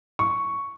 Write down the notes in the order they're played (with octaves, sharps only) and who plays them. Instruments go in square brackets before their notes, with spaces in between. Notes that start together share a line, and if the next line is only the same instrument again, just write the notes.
[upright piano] C#6